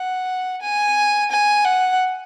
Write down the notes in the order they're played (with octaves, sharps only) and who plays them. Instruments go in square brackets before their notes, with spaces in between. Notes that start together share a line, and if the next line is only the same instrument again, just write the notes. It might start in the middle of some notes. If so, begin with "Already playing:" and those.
Already playing: [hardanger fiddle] F#5
G#5
G#5
F#5